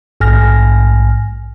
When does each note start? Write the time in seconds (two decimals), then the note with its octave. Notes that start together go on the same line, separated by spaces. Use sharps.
0.20 A#1 G#2 G#5 F6 A#6